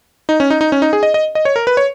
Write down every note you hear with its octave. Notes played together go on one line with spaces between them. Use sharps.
D#4
C#4
D#4
D#4
C#4
D#4
G#4
D#5
D#5
D#5
C#5
A#4
B4
C#5